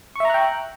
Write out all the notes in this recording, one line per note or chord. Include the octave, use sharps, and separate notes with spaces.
E5 G5 A#5 C#6 F#6